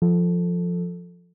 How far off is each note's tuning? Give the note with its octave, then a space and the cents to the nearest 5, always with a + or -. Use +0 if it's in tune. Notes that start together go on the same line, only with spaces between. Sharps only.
F3 +0 A4 +0